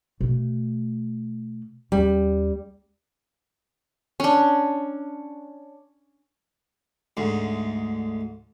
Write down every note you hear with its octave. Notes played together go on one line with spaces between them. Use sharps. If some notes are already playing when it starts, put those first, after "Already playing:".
B2 A3
D#2 G3 C#4
C#4 D4
D2 G#2